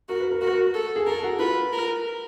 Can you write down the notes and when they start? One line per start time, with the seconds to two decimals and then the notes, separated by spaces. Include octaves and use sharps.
0.09 F#4 A#4
0.20 B4
0.31 A#4
0.41 F#4 A#4
0.75 A4
0.96 G#4
1.06 A4 A#4
1.23 F#4
1.39 F4 B4
1.72 A#4